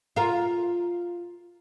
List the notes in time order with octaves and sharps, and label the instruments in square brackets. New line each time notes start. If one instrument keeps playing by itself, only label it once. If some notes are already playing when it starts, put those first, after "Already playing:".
[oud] F4 A#4